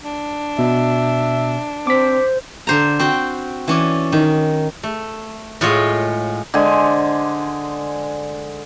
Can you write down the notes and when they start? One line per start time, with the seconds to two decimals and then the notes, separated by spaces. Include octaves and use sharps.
0.02 D4
0.59 B2 E5
1.87 C4 C5 D6 B6
2.67 D3 C5 A#5
2.99 C4 F#4 G5
3.68 E3 C#4 D5
4.12 D#3
4.83 A3
5.61 A2 G#3 F4 C#5 D#5
6.54 D3 G#3 C5 G#5